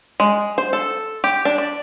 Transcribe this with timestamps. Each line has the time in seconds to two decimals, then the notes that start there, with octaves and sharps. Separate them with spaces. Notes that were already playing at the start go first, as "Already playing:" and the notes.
0.20 G#3
0.58 C5
0.73 A4
1.24 G4
1.45 D4
1.58 D5